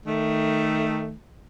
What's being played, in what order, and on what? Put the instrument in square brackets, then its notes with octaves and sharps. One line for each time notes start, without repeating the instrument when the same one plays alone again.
[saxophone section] D#3 A3